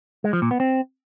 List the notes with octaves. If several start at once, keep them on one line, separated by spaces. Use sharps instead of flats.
G#3
F3
A#2
B3
C4